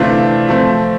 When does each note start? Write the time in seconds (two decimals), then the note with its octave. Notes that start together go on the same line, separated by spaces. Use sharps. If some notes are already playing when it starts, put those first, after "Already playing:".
Already playing: C3 E3 A3 D4 F4
0.48 F3 A3 C4